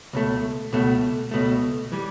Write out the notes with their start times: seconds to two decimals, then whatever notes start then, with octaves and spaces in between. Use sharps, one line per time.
0.13 C#2 B2 A3
0.73 C#2 B2 A3
1.31 C#2 B2 A3
1.92 E3 G3